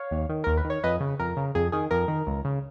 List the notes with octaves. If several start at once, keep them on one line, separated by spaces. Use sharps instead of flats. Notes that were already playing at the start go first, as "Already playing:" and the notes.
Already playing: C#5 F5
D#2
D#3
D#2 A#4
B4
D#3
C#5
F2 B4 D#5
C#3
F2 A#4
C#3
F2 G#4
D#3 G#4
F2 A#4
D#3
C#2
C#3